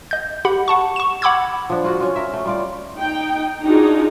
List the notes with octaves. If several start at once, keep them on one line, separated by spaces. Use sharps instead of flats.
D#5 G6
G4 F#5 B5
F#5 A5 C#6
C#6 E7
F#5 B5 D6 E6 G#6
F3 D4
F4 F#4
C#4 F4
A#4 E5
A3
G3 F4 D5
D#4 G5
D4 D#4 F4 F#4 G#4